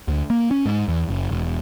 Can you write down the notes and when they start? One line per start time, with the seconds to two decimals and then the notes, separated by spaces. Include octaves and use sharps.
0.08 D2
0.30 A#3
0.51 C#4
0.65 G#2
0.88 E2
1.09 F#1
1.31 E1